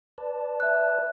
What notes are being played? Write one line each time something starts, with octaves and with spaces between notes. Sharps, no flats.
B4 D5 A5
E5 F#6